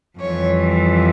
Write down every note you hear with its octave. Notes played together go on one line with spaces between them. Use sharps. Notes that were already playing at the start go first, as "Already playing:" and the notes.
F2 E3 G3 C#5